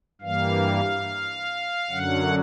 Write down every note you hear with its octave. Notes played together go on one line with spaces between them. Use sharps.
G2 E3 G3 A#3 F5
F#2 D3 F#3 F#5